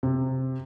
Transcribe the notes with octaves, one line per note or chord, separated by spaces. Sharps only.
C3